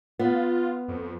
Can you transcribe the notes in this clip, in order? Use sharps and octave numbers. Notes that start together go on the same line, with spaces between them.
B3 F4
F2
F2